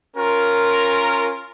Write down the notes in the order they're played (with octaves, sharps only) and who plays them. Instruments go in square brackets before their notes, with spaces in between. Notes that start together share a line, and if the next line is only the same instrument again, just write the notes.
[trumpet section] C#4 F4 A#4